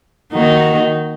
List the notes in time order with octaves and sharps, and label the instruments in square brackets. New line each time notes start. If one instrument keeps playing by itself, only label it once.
[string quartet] D#3 A#3 D#4 F#4